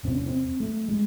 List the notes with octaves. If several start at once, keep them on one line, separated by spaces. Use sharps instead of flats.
E2 C3 C4
C#4
C4
A3
G#3